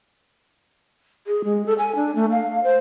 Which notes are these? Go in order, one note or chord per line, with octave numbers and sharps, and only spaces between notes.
G#4
G#3
A4
G#5
D4
A3
F5
C5